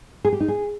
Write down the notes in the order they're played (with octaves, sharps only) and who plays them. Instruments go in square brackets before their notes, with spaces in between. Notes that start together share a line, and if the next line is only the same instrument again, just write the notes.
[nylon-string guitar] G#4
G4
D#4
G#4